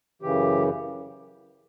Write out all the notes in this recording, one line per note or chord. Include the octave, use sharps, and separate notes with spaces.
F#2 C#3 E3 G4